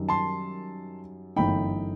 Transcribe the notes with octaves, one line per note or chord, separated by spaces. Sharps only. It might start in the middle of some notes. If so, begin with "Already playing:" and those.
Already playing: F#2 D#3 G3 D#4
A5 C6
G1 F#2 E3 A3 D#4 G5 B5